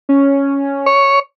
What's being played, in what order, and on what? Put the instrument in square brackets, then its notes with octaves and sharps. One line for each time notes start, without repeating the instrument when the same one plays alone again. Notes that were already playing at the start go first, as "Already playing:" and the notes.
[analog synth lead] C#4
[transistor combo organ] C#5